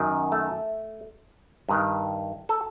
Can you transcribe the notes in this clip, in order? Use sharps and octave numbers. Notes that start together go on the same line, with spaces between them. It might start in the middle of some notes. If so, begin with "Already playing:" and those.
Already playing: F#2 D#3
A3
G2 D#3
A4